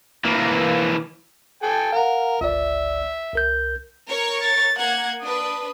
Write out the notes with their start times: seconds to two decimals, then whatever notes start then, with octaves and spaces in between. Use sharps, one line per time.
0.25 E3 A#3
1.63 A4 G5 G#5
1.93 A#4 F5 F#5
2.41 G1 C#2 D5 E5
3.33 C2 A#4 G6
4.07 A#4 C#5 C#6
4.42 A6
4.78 A#3 F#5 G#6
5.22 D4 B4 D#6